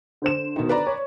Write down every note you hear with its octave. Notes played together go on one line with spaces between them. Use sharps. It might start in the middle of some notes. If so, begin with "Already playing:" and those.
D3 C5 E7
B2 D#3
B4 D5 A#5
C#5